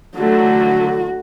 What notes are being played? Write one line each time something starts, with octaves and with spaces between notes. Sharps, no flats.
D3 F#3 A3 F#4